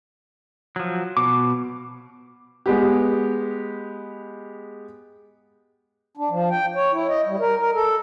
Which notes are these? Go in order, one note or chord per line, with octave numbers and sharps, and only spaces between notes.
F3 F#3
B2 D6
G#3 B3 G4
D4
F3
G5
C#5
E4
D#5
G3
A#4
A#4
A4